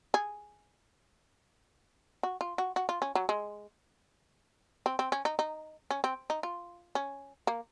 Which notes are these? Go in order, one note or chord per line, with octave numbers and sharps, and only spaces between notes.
G#4
F#4
F4
F#4
F#4
F4
C#4
F#3
G#3
C4
C4
C#4
D#4
D#4
C#4
C4
D#4
F4
C#4
A#3